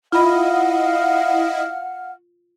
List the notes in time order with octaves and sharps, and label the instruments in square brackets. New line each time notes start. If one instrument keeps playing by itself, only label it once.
[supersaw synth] E4 D#5 [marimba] F4 B5 [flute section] F5 F#5 F6